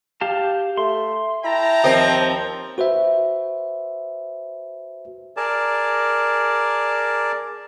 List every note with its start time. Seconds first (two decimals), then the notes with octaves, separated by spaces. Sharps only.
0.21 G4 F5 A5
0.77 A3 C6
1.44 E4 G5 A5 A#5
1.84 D#2 F3 C4 D#5
2.78 F#4 B4 C5 E5
5.37 G#4 A#4 D5 A5